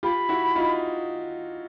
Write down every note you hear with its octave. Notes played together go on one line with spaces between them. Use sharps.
F4 G4 B5
E4 F#4
D#4 F4